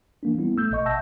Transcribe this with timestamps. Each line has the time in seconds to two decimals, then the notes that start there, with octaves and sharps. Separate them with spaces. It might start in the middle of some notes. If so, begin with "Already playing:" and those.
0.23 E3 A#3 D4
0.38 G3 B3 C#4 E4
0.57 A3 E6 G6
0.71 G#1 B2 D#5 C#6
0.86 E5 F#5 A5 E6 G6 A#6